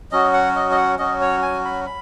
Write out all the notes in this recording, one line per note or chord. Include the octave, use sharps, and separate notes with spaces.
F#3 C#4 F#4 D#5
F#5
D#5
D#5
F#5
F#3 C#4 F#4 D#5
C#5
G#5
B5
B5